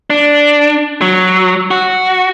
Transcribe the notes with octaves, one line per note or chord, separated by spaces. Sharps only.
D4
F#3
F#4